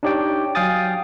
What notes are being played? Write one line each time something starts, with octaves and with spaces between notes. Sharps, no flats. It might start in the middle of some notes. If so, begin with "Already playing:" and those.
D4 D#4 G4 C#5 D5 G5
F#3 F5 G5 G#5 D#6 A6